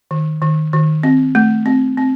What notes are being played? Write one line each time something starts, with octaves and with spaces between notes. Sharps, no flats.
D#3
D#3
D#3
C4
A3
C4
C4